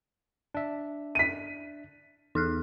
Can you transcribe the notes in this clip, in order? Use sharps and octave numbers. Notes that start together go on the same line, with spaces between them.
D4 E5
B6 D#7
E2 D#4 F6 F#6